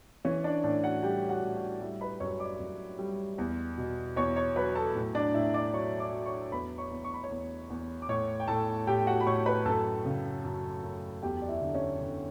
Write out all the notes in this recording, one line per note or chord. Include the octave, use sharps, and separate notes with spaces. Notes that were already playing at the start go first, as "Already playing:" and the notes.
E3 C#4 C#5
D4 D5
A2 D4 D5
F#4 F#5
G3 G4 G5
F#4 F#5
A2
F#4 F#5
G3 E4 E5
B4 B5
F#2 C#5 C#6
D5 D6
F#2
G3
E2
B2
E2 C#5 C#6
C#5 C#6
F#3 B4 B5
A4 A5
A2
D4 D5
A2 E4 E5
D5 D6
F#3 C#5 C#6
D5 D6
F#3
C#5 C#6
E2 B4 B5
C#5 C#6
E2
C#6
B5
C#5 C#6
E2
E2
D6
A2 C#5 C#6
G5
A2 A4 A5
A2 G4 G5
F#4 F#5
B5
A2 C#5 C#6
B4 B5
F#2 A4 A5
C#3
F#2
F#2
E2 G4 G5
D5
E4 E5
D3
C#4 C#5
D3